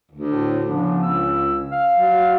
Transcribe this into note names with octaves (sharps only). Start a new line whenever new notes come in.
D2
A2
C#3 F3 B3 D4
C#2 E6
F5
F#3